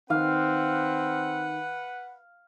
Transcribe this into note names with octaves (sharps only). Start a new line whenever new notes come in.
D#3 C4 B4 F5 F#5